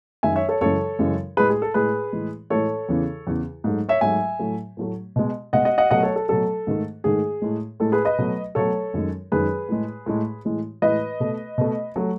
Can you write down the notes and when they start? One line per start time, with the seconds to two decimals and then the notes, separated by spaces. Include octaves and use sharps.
0.23 F#2 D#3 G#3 E5 G#5
0.36 C#5 E5
0.49 A4 C#5
0.61 F#2 C#3 E3 G#3 A4 C#5
0.99 F#2 C#3 E3 G#3
1.37 A2 G#3 G#4 B4
1.50 G#4
1.62 A4
1.74 A2 G#3 G#4 B4
2.13 A2 E3 G#3
2.50 A2 E3 G#3 A4 C#5
2.89 E2 C#3 E3
3.27 E2 C#3 E3
3.64 G#2 F#3 A3
3.89 C#5 E5
4.01 G#2 F#3 A3 E5 G#5
4.39 A2 F#3 A3
4.77 A2 F#3 A3
5.16 B2 G#3
5.53 B2 G#3 D#5 F#5
5.65 D#5 F#5
5.78 D#5 F#5
5.91 B2 F#3 A3 D#5 F#5
6.03 A4 C#5
6.16 A4
6.29 B2 F#3 A3 A4
6.67 G#2 D#3 A3
7.04 G#2 D#3 A3 G#4
7.42 A2 G#3
7.80 A2 G#3 A4
7.92 G#4 B4
8.05 B4 D#5
8.18 B2 F#3 A3
8.55 B2 F#3 A3 A4 C#5
8.94 F#2 D#3 G#3
9.32 F#2 D#3 G#3 G#4 B4
9.69 A2 G#3
10.06 A2 G#3
10.45 A2 E3 G#3
10.82 A2 E3 G#3 B4 D#5
11.20 B2 A3
11.58 B2 A3
11.96 F#3 A3